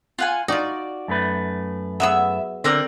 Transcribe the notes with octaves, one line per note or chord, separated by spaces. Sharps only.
F4 F#5 G#5
D#4 F4 F#4 D5
F#2 A3 B4
F#3 B3 G#4 E5 E6
D3 C4 A#4 D5